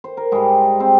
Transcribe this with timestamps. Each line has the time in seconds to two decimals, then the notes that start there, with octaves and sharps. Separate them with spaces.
0.04 C5
0.17 A#4
0.32 G#2 G3 G#3 G#4
0.80 C4 C5